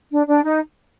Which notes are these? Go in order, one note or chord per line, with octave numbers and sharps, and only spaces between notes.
D4
D4
D#4